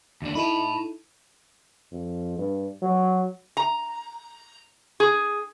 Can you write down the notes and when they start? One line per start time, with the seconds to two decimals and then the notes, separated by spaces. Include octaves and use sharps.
0.22 D#2 D4
0.35 D#4 E4 A4 A5 B5
1.92 F2
2.38 G2
2.82 F#3
3.57 A#5
5.00 G#4